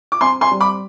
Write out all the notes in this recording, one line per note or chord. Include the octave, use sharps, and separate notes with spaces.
D6
C4 G#5 C6
G#5 C6
G3
B5 D6